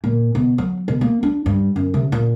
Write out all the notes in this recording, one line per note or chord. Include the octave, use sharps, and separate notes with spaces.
A#2
B2
F#3
B2
A#3
D4
G2
F#2
C3
A#2